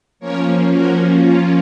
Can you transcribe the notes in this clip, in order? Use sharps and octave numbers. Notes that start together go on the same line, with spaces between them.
F3 A#3 C#4 A#4 C#5
F#4 A#4
F4